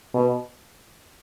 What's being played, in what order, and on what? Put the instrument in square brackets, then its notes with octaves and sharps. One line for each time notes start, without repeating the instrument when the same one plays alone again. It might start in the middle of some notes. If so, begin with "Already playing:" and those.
[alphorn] B2